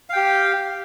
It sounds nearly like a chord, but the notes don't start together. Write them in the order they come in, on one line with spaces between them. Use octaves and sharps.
F5 G5 G4